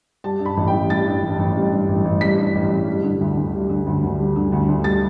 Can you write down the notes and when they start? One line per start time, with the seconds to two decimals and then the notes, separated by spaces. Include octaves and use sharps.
0.24 G3 A5
0.40 G2
0.45 B5
0.57 A1
0.67 G5
0.73 A1
0.90 G3 A6
1.06 G2
1.23 A1
1.39 A1
1.56 G3
1.72 G2
1.89 A1
2.04 A1
2.21 G3 B6
2.37 G2
2.55 A1
2.71 A1
2.87 G3
3.04 D3
3.21 D2
3.37 D2
3.54 G3
3.69 D3
3.87 D2
4.03 D2
4.19 G3
4.36 D3
4.52 D2
4.68 D2
4.84 G3 A6